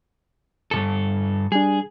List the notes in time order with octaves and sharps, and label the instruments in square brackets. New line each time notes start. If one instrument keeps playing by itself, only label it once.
[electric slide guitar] G2 B2 A4
[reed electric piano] G3 D4 [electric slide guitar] G#4